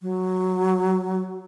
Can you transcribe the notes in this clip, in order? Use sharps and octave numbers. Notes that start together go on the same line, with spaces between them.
F#3